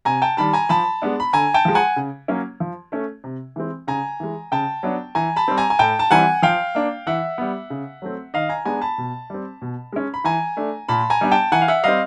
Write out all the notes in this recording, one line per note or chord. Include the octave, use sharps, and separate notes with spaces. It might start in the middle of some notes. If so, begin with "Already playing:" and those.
C3 G#5 A#5
G5 A5
D#3 G3 A5 B5
G#5 A#5
F3 A5 B5
G#3 B3 D4
B5
D3 G#5 A#5
G5 A5
F3 G#3
F#5 G#5
C#3
F#3 A#3 C#4
F3
A3 C#4
C3
E3 G#3 C4
C#3 G#5 A#5
E3 G#3
C#3 G5 A5
F#3 B3 D4
E3 G#5 A#5
A5 B5
G3 C4
G#5 A#5
G#5
A2 G5 A5
A5
E3 G3 C4 F#5 G#5
F3 F5 G5
A#3 D4
E3 E5 F#5
G3 B3
C#3
F#3 A3 C4
D#3 D#5 F5
G#5 A#5
G#3 B3 D4 G#5 A#5
A5 B5
B2
G3 C4
B2
G#3 C#4
B5
E3 G#5 A#5
A3 D4
A#2 A5 B5
G#5 A#5
G3 B3 D4
G5 A5
E3 F#5 G#5
F5
E5 F#5
G3 C4 D#5 F5